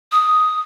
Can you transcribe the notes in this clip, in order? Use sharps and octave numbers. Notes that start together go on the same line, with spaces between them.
D#6